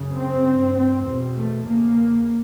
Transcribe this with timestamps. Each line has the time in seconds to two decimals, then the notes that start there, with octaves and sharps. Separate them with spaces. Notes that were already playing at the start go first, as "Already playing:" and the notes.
Already playing: F#2 C#3
0.15 C4
0.45 G2
0.75 C4
1.05 E2 B2
1.35 A3
1.64 E2 C#3 A#3